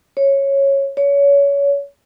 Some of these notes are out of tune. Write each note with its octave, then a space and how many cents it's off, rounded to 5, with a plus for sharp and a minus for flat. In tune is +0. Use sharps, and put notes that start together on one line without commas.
C#5 -10
C#5 +25